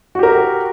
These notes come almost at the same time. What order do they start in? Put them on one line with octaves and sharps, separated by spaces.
F#4 G4 A#4